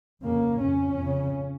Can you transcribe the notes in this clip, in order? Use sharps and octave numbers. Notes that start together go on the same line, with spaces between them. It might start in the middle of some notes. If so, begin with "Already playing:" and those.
F2 C#3 A#3
F2 C#3 C#4
F2 C#3